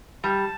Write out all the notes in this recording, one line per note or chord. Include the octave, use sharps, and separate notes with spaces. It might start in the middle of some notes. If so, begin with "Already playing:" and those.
G3 A5